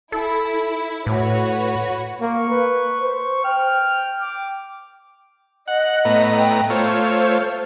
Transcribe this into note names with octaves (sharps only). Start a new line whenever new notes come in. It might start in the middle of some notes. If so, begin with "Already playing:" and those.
E4 A4
A2 F#4 B4 C#5
A#3 C#6
B4
C5
G5 F6
D6
D#5 F#5
A2 B3 A#5
G5
A3 F4 C5 C#5